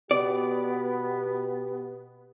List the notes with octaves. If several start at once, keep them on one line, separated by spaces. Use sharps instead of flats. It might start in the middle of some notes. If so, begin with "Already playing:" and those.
B2 B3 G4 D5